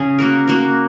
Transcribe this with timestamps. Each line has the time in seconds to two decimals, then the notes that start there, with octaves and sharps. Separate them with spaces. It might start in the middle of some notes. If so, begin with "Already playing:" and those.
Already playing: C#3 C#4 G#4
0.18 A#3 F#4 A#4
0.48 A#3 F#4 A#4